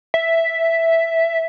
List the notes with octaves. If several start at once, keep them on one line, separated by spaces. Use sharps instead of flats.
E5